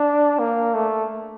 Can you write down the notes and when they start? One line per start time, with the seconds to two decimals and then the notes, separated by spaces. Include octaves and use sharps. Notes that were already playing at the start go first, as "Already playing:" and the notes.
Already playing: D4
0.39 A#3
0.74 A3